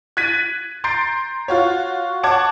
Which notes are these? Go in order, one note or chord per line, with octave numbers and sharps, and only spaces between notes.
F#6 G#6 A6 B6 D#7
A#5 C6 G6 A6 C7 D7
F4 F#4 C#5
C#5 F#5 A5 D6 G#6